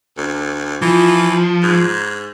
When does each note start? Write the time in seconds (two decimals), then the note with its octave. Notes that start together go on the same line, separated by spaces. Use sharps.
0.18 D2
0.82 E3 F3 F4
1.63 G#2